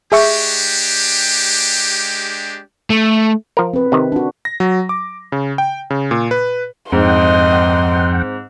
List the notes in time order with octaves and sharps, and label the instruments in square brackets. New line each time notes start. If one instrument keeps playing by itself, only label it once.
[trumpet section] G#3 D4 G4 [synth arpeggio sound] G#4 E5 C#6
[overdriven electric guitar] A3
[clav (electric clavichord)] F3 A#4
[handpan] C4 B4
[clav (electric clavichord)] C3 D#3
[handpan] D4 F#4
[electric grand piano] A#6
F#3
D6
C#3
G5
C#3
A#2
B4
[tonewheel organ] F2 F#5 G5 [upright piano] G#2 C4 [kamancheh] D#5 C6